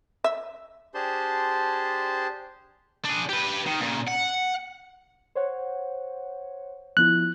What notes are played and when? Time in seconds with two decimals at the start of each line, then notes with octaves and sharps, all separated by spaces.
0.24 E5
0.94 D4 G4 G#4 C5 A5 C6
3.05 D4 G#4
3.29 G4 B4
3.66 D#3
3.80 A#2 C#3
4.07 F#5
5.35 C5 C#5 F#5
6.97 F3 B3 E4 F#6